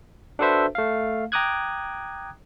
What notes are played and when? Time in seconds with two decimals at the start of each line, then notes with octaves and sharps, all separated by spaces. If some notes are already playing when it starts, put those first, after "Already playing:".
0.39 D4 F#4 A4 B4 C5 E5
0.75 A3 F5
1.32 G5 A#5 D6 D#6 F#6 G#6